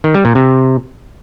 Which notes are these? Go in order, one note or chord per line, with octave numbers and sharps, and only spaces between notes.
D#3
G3
A#2
C3